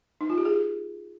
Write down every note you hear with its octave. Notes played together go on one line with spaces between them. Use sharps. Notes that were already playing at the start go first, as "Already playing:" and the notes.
D#4
F4
G4
G#4